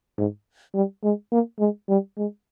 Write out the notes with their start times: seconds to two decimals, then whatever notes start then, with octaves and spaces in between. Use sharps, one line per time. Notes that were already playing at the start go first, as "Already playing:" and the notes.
0.18 G#2
0.75 G3
1.04 G#3
1.32 A#3
1.59 G#3
1.89 G3
2.17 G#3